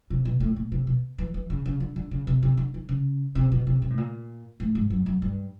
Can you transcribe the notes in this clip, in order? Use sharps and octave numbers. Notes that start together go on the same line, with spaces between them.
C3
B2
A2
A#2
C3
B2
E3
E3
C#3
C#3
D3
D3
C#3
C3
C3
D3
D#3
C#3
C3
B2
C3
C3
A2
A#2
A2
G#2
F#2
F#2
G2